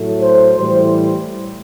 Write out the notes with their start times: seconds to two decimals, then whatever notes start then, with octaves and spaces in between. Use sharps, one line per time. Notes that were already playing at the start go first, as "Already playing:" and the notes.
Already playing: A2 F#3 A3
0.22 C5
0.56 A2 E3 G3 C5